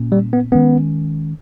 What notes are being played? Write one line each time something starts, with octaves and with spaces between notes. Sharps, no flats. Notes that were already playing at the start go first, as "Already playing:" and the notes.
Already playing: A#2 A#3 C#4
G3
B3
D#3 G#3 B3 C#4